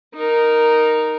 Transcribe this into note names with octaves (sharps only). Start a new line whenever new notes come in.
D#4 A#4